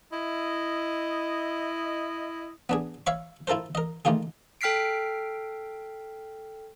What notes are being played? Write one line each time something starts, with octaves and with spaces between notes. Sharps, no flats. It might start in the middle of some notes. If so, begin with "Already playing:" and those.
E4 D#5
B3 D4 G#4
C#5 E5 F5 B5 C#6
E4 F4 A4 A#4 C5
A#4 D#5
D#3 A3 A#3 F4 G#4
A4 G5 F6 B6 C7 D7